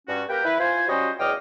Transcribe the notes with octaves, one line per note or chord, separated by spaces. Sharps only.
G2 C#4 F#4
A#3 G4 A#4 B4 G5
E4 B4
F4 C5 G#5
F#3 G3 C#4 F#4 C5 D#5
E2 C#3 D#5 G5 D6 F6